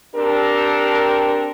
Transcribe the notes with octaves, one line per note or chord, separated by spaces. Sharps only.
C4 D4 G4 A4 A#4